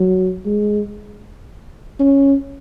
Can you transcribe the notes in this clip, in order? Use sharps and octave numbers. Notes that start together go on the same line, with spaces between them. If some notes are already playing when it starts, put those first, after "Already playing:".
Already playing: F#3
G#3
C#4